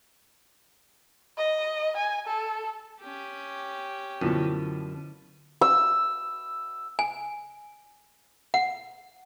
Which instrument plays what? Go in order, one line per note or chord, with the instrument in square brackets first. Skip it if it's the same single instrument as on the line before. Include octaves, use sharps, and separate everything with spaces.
[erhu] D#5
G#5
A4
[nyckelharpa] C#4 G4
[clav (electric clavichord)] F#2 [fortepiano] B2 F3 [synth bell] D3 E4 D#7
[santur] E6
[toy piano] G#5
F#5